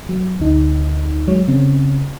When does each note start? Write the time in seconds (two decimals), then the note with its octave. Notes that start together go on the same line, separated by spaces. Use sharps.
0.09 F#3
0.40 D2 D#4
1.28 F#3 G#3 C#5
1.48 C#3 C4 C#4